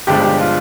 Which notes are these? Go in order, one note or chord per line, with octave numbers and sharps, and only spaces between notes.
G1 G2 F3 G#3 D4 G4
G4
F4